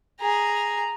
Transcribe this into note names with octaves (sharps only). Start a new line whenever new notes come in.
G#4 A#5